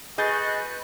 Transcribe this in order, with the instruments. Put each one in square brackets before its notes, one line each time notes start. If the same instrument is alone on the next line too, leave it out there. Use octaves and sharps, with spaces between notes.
[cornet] F#4 [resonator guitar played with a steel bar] G#4 [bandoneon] B4 F#6 [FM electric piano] D#5 G6 A6